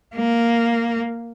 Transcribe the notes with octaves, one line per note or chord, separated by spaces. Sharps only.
A#3